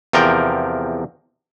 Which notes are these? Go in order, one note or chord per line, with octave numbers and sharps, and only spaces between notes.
E2 C3 F3 A#4 G5